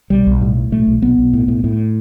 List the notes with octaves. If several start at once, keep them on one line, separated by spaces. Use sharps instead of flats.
B1 G3
B1
A2 G3
A2
B1 A3
B1
B1 B3
B1
A2
A2
A2